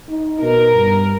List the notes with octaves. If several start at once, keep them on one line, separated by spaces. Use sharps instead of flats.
D#4
B2 A#4
G2